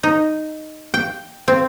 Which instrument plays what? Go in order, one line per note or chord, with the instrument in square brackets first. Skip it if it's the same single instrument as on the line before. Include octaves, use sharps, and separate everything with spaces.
[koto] D#4
G5
C4